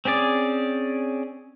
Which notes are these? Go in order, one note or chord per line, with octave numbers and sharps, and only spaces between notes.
C4 C#4 G#4 D5